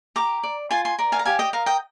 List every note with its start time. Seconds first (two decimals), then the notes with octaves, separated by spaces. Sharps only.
0.16 G4 A#5 D6
0.43 D5
0.71 F4 G#5 C6
0.85 G#5 C6
0.98 A#4 D5
1.12 F5 G#5
1.19 A#5
1.25 G4 F5 G#5
1.39 D#5 G5
1.53 A#4 D#5 F5
1.66 D#5 G5